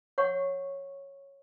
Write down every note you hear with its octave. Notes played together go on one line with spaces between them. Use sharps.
C#5 F#5 C#6